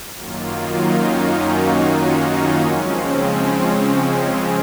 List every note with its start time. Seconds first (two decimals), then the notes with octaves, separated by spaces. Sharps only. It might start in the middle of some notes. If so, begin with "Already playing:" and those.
0.14 F#2 D#3 F#3 A#3 F4
0.45 D#4
0.77 C#4
1.07 F#4
1.37 F4
1.99 D#4
2.30 D#4
2.61 C#3 F3 G#3 C4 C#4